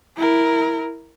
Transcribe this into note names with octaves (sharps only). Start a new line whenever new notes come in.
E4 A#4